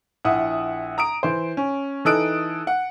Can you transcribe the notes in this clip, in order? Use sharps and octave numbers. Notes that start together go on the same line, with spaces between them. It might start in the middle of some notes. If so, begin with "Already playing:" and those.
A#1 E4 F#5 D#6
A#5 D#6 D7
E3 C5
C#4
E3 D#4 A4 D#6 F#6 D7
F#5